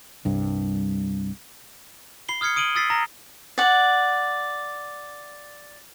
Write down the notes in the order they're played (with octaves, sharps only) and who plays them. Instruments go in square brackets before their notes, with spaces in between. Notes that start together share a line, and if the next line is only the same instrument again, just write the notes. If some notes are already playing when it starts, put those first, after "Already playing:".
[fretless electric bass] C2 G2
[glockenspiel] B5 C7 G7
D#6 F6 G#6 C7 C#7
D#6 D7 D#7 F#7 G7
D#6 E6 A6 B6 C7
A#5 A#6
[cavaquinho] D5 F#5